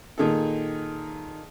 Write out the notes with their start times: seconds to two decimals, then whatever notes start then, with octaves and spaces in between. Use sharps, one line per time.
0.18 A#2 D#3 G#4 A4